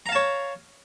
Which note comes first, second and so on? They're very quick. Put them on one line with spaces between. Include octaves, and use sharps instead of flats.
A#5 F5 A5 C#5